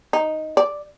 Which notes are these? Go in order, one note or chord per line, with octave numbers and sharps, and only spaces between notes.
D#4
D5